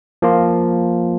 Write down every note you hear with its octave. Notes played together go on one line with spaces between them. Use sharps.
F3 A#3 F4